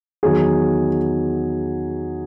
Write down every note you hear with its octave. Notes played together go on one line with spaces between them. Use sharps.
E2 D#3 F#3 G#4